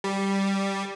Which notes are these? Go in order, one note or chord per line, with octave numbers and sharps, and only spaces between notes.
G3